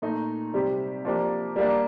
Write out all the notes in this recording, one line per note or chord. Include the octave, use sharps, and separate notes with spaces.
A#2 A3 D#4
C3 G3 C4 G4
F3 A#3 D4 G4
G3 A#3 D4